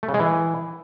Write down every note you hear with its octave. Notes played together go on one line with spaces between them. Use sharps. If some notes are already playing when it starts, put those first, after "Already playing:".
A3
C#3
G#3
E3